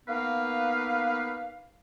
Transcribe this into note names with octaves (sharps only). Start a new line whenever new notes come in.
A#3 B3 D#4 B4 F5